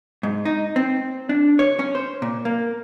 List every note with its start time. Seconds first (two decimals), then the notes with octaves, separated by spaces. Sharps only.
0.23 G#2
0.45 D#4
0.76 C4
1.29 D4
1.59 C#5
1.79 C#4
1.95 C5
2.22 A#2
2.45 A#3